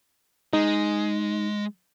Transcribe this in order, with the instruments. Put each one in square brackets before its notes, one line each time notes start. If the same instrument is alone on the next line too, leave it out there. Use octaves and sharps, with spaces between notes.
[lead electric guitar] G#3 [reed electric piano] D#4